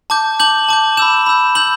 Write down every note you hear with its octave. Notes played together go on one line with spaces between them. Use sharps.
A5 D6 G6
A5 D6 G6 F#7
A5 D6 G6
B5 E6 G6 E7
B5 E6 G6
B5 E6 G6 F#7